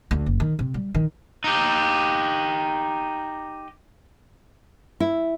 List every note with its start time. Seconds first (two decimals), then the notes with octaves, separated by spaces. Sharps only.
0.11 D2
0.26 F#1
0.40 D#3
0.59 C3
0.74 G3
0.94 D#3
1.44 D#4 G4
5.00 E4